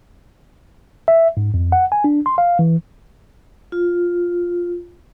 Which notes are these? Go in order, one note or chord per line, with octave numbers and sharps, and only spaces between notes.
E5
G#2
F2
F#5
G#5
D4
C6
F5
E3
F4